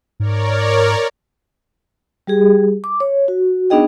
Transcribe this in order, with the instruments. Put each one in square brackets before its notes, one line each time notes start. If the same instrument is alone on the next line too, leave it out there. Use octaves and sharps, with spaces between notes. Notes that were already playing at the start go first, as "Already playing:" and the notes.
[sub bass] G#2 [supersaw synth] A#4 C#5 D5
[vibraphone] G3 G4 G#4
D6
C#5
F#4
B3 D4 D#4 G#4 D#5 G5